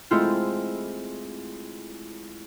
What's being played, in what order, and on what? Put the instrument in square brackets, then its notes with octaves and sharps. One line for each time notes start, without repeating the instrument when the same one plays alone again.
[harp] G#3 A3 C4 E4 F4